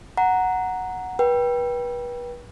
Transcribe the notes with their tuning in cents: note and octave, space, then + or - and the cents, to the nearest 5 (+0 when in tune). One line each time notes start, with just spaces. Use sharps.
F#5 +0 A#5 +0
B4 -30 G5 +0